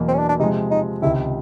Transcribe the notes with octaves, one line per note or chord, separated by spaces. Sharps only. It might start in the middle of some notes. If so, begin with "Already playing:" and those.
Already playing: E2 B2 F#3 A#3
C4
C#4
D4
D4
C3 F3 G#3 D#4
D#4
C#2 C3 D#3 E4